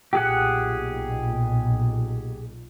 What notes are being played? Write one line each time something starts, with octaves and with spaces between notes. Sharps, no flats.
B1 A#2 G4 G#4 F#5